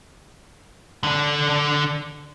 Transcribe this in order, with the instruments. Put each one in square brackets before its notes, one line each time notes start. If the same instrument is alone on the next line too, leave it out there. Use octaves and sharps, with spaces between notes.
[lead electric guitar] D3 D4